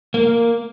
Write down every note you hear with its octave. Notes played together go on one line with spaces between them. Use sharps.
A#3